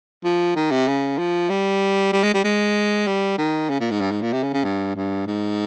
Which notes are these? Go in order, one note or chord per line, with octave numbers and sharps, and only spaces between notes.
F3
D#3
C3
C#3
F3
G3
G3
G#3
G3
G#3
G3
D#3
C#3
A#2
G#2
G2
G#2
A#2
C3
C#3
C#3
G2
G2
G#2